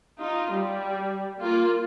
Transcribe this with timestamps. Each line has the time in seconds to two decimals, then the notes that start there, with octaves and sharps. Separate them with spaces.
0.21 D#4 F4
0.53 G3
1.38 A#3 F4